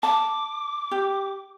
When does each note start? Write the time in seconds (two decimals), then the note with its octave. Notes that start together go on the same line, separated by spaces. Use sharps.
0.03 A5 D6
0.91 G4